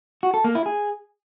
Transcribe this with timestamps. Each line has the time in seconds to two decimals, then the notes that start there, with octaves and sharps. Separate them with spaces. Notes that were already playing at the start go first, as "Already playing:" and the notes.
0.23 F#4
0.34 A4
0.44 A#3
0.55 E4
0.66 G#4